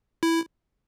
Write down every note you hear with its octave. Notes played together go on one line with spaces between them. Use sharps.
E4